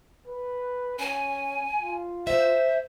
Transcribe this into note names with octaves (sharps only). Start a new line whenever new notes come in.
B4
C#4 G#5
F4
C5 E5